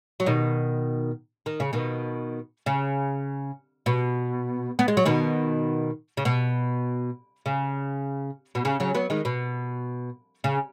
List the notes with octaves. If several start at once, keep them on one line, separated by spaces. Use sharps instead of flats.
F#3
B2 D#3
D#3
C#3
B2 D#3
C#3
B2
B3
G#3
F#3
B2 D#3
C#3
B2
C#3
B2
C#3
C#3 F#3
F#3 B3
D#3 G#3
B2
C#3